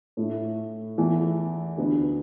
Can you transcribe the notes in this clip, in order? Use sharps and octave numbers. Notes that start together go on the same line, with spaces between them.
A2 A3 E4
E2 E3 A3
D2 D3 B3 D4